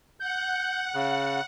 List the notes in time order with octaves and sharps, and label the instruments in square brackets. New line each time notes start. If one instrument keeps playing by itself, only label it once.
[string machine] F#5 [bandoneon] G6
[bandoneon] C#3